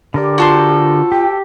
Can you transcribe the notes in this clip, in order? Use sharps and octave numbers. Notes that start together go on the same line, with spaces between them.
D3 G4 A#4 D5
F4 F#4 A4 C5
G4 G5